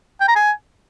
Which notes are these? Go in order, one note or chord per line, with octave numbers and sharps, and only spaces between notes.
G5
A#5
G#5